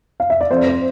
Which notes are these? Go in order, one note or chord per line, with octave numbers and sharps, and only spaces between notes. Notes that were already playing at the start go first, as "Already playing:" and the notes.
F5
E5
D5
F2 C5
C5